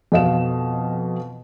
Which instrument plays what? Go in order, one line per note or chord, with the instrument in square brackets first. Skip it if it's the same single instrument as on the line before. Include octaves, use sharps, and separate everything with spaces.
[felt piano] F2 B2 D#5 F5 E7